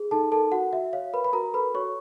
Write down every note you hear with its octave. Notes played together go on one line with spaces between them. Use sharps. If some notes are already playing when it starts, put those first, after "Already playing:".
Already playing: G#4
D#4 A4 A5
A4 A#4 A5
F#4 F#5
F#4 E5
C#5 F5
A#4 B4 B5
B5
F#4 A#4 A#5
A4 B4 B5
F#4 C#5 C#6